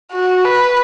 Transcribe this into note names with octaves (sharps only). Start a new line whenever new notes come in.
F#4
B4